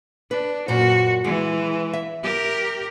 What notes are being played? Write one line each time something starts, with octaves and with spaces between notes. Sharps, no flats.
D4 B4
F#2 A#2 F#4 C5
E3 G#3
E5
G4 A#4